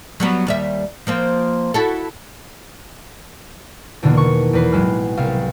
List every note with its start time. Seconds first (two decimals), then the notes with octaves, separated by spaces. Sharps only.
0.20 F#3 G3 B3
0.47 D#2 G3 E5
1.07 F3 A#3 C4
1.74 E4 F#4 A4
4.03 E2 B2 D3 D#3 A#3
4.17 C#6
4.53 E2 B4 C7
4.72 A1 F#3 G#3 F6
5.17 C2 F5